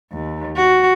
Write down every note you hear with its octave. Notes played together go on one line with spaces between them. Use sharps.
D#2
F#4